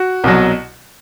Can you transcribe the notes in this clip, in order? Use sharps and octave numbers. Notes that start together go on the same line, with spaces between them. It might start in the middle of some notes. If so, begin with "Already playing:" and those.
Already playing: F#4
C2 B2 F#3